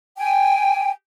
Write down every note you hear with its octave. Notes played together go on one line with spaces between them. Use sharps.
G5 G#5